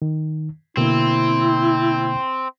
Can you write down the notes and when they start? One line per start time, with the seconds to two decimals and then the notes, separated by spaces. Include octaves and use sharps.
0.02 D#3
0.77 B2 D3 A#3 C4 E4